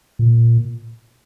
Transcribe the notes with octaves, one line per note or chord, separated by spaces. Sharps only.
A#2